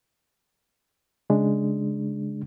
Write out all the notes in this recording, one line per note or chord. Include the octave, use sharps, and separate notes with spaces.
C#3 G#3 D4